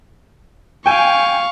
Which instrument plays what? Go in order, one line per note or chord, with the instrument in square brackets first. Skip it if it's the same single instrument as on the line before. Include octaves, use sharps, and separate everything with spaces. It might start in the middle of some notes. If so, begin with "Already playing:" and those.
[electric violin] F5 C#6 [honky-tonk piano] G5 G#5